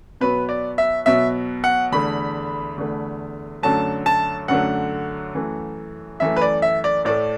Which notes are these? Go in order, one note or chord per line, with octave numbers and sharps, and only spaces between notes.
B2 F#3 B3 B4
D5
E5
B2 F#3 B3 E5
F#5
E2 D3 A3 B5
E2 D3 A3
F#2 D3 F#3 A3 A5
A5
F#2 D3 F#3 A3 F#5
F#2 E3 A3
F#2 E3 A3 E5
B4
D5
E5
D5
A2 A3 D5